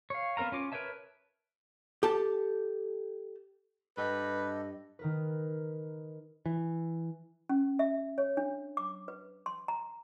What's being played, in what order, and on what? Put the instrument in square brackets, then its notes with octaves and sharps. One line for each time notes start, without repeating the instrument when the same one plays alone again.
[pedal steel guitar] C#5 F5
B3 C4 A#4 F5 A#5
C#4 F4 D6
A#4 B4 C#5 E5 A5
[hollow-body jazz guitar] G4 A4 A5
[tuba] G2 [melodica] G4 A4 [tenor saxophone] B4 [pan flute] D#5
[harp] D#3 A#4 B4
[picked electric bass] E3
[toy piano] C#4
E5
C#5
D4
D6
B4
C6
A#5